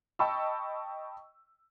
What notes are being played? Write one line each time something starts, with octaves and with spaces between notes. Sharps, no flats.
D#5 G5 A5 B5 C#6 E6